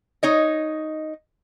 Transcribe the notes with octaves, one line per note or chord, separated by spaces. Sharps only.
D#4 C#5 D#5